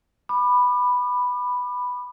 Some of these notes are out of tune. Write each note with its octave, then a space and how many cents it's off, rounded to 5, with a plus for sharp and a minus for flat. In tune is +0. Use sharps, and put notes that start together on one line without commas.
B5 +0 D6 +35